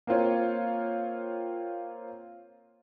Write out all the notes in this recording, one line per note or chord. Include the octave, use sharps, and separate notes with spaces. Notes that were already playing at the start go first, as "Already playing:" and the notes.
A#3 C4 F4 C#5